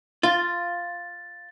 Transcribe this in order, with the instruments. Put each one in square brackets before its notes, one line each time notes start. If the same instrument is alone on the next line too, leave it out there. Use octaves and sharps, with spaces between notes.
[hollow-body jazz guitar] F4 [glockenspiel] A6